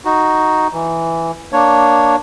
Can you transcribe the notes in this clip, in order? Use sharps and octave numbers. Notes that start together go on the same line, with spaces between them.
D#4 F#4
E3
A#3 D4 C#5